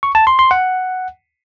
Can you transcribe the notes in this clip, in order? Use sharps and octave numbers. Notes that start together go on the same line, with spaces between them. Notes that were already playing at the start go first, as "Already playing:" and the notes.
C#6
A5
C6
C6
F#5